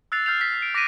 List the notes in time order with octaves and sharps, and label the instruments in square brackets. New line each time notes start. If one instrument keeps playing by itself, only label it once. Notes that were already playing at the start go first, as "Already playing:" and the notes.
[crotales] E6 F#6 A6 C7 F7
F6 G6 C7 F7
B6
B6 D7
D6 A#6 B6 D7 D#7